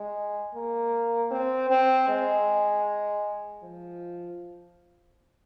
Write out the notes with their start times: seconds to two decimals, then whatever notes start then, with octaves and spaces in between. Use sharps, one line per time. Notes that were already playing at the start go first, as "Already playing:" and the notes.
Already playing: G#3
0.54 A#3
1.31 C4
1.70 C4
2.09 G#3
3.63 F3